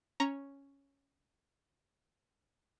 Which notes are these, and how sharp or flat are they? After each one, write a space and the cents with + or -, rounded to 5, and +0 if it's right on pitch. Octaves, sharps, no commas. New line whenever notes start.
C#4 +0 A#5 +0